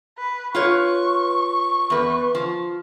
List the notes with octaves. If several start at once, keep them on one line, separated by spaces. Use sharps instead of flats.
B4
F4 B4 C#5 C#6
E2 B4
F3